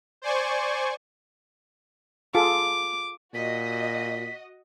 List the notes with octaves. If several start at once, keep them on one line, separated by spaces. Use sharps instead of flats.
C5 D5 G#5 C#6
F4 G#4 A4 D6
A#2 F#4 D#5 B6